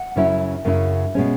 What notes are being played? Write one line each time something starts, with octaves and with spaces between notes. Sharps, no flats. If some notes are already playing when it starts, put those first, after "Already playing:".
Already playing: F#5
F#2 C#3 F#3 C#4 E4
F#2 C#3 F#3 C#4 E4
B2 G#3 C#4